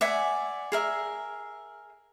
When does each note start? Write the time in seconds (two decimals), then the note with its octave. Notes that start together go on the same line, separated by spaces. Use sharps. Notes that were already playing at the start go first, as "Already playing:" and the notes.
0.01 D5 E5 F#5 G#5
0.72 G#4 A#4 E5